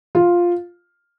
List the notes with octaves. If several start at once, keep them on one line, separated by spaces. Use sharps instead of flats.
F4